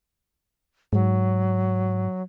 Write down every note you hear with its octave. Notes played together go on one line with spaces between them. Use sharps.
G#2 F#3